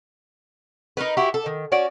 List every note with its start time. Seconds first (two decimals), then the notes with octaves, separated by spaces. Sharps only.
0.97 D#4 F4 A#4 B4
1.17 E4 F#4 G4
1.34 A4
1.46 D#3
1.72 C#4 F#4 D5